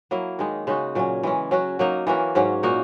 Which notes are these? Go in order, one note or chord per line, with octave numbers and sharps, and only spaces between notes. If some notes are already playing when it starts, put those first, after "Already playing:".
F#3 A#3 E4
D#3 G#3 D#4
C#3 G#3 D#4 F#4
A#2 F#3 C#4
E3 G#3 C#4
F#3 C#4 F#4
F#3 A#3 D#4
E3 A#3 C#4 F#4
G#2 F#3 C#4
A#2 A#3 D#4 F#4